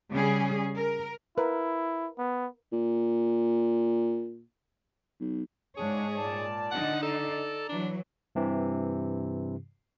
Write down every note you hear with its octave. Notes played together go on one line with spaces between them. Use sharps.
C#3 G3 C#4 G#4
A#4
E4 A#4 B4
B3
A#2
B1
G#2 C#3 D4 G#4 C#5
A#2 D5 A5
D3 D#4 F#5
A4 D5 A#5
E3 F#3 D4
G2 C3 E3